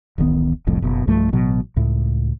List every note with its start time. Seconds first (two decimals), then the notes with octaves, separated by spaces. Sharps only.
0.18 D1 A1 D#3 B3
0.67 F1 C2 F2 A2
0.82 F#1 B2
1.07 B1 G2 F3 A3
1.32 A1 B2 F#3
1.76 C#2 A2